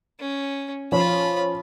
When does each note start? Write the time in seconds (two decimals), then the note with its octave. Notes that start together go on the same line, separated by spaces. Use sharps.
0.20 C#4
0.92 F3 C#4 F4 B5